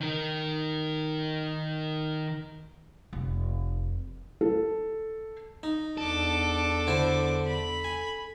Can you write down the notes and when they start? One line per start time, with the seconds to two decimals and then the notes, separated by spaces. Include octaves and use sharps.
0.01 D#3 A#4
3.13 F1
4.41 A4
5.63 D#4
5.98 E2 D4 A4 D6
6.87 D3 E4 C5
7.46 B5
7.84 G#5